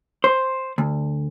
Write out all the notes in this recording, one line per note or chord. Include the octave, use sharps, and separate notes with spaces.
C5
D2